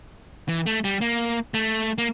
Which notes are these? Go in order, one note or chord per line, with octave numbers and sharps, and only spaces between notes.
E3
A3
G3
A#3
A3
A#3